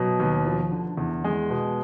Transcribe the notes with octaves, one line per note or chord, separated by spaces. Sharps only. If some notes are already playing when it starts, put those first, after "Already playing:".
Already playing: B2 F#3
D#2
F3
D3
E2
G#3
B2